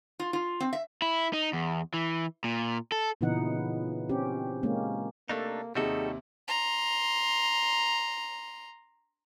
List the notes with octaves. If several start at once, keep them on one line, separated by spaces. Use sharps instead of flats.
F4
F4
C4
E5
E4
D#4
E2
E3
A#2
A4
A#2 C#3 E3 B3 D#4 F#5
C4 C#4 G4
G#3 A#3 C#4
C3 A3 A#3 D4 D#4 A4
D#2 C3 G3 D#4 F#4 G#4 A4
A#5 C6